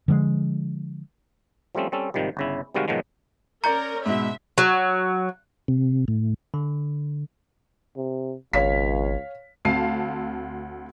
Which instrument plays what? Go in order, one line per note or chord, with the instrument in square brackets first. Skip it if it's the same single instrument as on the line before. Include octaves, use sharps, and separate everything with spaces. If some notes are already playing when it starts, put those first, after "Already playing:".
[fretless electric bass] D3 F3 G#3
[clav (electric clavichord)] F3 G3 A3 C4 C#4
G3 C4 C#4 A4
G#1 C3 D#3 F3 G3
G1 C#3 E4
C3 D#3 G3 G#3 F#4 F5
G#2 B2 D#3 F3 F#3 G#3
[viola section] C#4 A#4 [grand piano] D5 G6 C#7 [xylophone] A#5
[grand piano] G#2 B2 [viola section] E5
[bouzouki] F#3
[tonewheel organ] C3
A2
[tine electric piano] D3
[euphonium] C3
[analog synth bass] G#1 [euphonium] C#2 [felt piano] C#5 F5 B6
[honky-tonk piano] D2 C4 F5 A5 C7